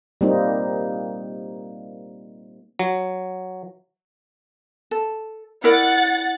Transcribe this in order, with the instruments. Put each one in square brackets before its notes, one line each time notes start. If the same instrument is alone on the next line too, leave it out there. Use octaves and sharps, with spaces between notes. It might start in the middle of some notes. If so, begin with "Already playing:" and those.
[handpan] G3 A#3 C4 D#4
[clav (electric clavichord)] F#3
[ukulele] A4
[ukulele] E4 A#4 D5 [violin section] F#5 A6